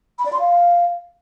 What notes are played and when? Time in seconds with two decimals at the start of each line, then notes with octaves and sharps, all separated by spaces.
0.19 B5
0.26 D5
0.33 C6
0.39 F5